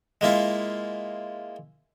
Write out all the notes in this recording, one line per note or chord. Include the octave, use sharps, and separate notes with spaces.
G#3 A#3 E4 F4